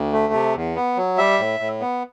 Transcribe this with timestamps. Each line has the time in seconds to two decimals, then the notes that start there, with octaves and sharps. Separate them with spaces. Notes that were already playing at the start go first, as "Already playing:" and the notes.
Already playing: D2
0.13 A3
0.33 C3
0.55 E2
0.75 B3
0.97 F#3
1.18 G3 E5
1.39 A2
1.60 A2
1.80 B3